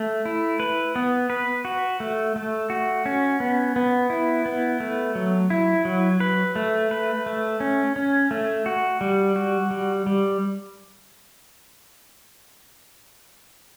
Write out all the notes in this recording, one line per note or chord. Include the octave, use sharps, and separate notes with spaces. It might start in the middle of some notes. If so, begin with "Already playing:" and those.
Already playing: A3
E4
B4
B3
B4
F#4
A3
A3
F#4
C#4
B3
B3
E4
B3
A3
F#3
E4
F#3
B4
A3
B4
A3
C#4
C#4
A3
F#4
G3
F#4
G3
G3